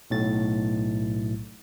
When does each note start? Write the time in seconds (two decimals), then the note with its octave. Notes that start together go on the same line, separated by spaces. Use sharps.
0.10 B1 A2 A6